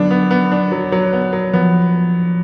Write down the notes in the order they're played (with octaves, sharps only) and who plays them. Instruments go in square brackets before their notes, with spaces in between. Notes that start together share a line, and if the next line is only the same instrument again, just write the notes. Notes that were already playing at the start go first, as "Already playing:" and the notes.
Already playing: [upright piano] D3 B3 D4 [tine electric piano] F#3
[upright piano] B3
B3
D4
F#3
F#3
B3
F#3
[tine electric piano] F3 [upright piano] B3